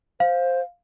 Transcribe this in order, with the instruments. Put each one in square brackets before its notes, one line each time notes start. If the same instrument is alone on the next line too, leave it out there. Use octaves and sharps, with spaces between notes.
[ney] C5 [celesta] F5